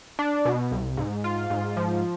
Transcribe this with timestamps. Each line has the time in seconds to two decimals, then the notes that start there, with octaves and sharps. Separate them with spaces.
0.19 D4
0.45 B2
0.71 C2
0.97 G#2
1.24 F4
1.50 G#2
1.77 F3